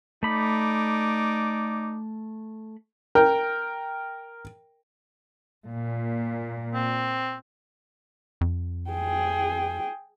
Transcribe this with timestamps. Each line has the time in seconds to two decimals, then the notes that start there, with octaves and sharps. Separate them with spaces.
0.23 A3 D#4 D5 B5 D6
3.15 A#4 G5
5.70 A#2
6.74 C4
8.41 F2
8.90 G#4 G5